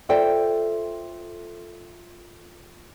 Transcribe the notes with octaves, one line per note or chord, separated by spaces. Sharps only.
F4 A4 C5 D5 E5 G5